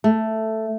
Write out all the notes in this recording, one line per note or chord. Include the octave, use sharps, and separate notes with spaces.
A3